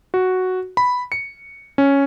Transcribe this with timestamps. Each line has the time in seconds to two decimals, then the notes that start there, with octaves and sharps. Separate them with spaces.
0.14 F#4
0.77 B5
1.12 C#7
1.78 C#4